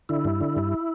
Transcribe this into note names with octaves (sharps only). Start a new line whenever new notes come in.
D3 E4
G2
D3
G2